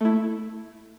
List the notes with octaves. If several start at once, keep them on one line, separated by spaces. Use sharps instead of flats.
A3 E4